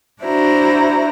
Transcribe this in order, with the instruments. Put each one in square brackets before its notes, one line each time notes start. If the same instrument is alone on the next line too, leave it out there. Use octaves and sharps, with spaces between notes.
[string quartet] D4 E4 F#4 C5 A#5